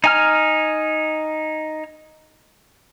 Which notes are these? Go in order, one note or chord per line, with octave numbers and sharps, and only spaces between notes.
D#4 G#5 F6